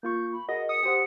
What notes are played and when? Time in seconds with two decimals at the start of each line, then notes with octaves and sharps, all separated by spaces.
0.03 A#3 F4 C#6 G6
0.33 B5
0.49 F#4 G#4 A#4 D#5 F#5
0.69 D#6 C#7
0.83 G4 C5 F#5